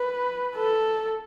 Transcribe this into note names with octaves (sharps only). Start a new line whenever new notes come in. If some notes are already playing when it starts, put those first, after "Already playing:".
Already playing: B4
A4